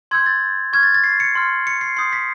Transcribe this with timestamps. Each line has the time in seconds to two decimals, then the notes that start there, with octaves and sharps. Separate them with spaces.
0.11 C6 E6 G6 G#6
0.26 A6
0.73 C#6 F6 G#6
0.83 A6
0.94 A6
1.04 C7
1.20 C#7
1.35 C6 F6
1.67 C#7
1.81 C7
1.97 C6 D#6 G6 C7
2.13 B6